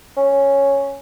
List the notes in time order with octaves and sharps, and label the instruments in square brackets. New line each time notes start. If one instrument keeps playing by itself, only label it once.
[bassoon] C#4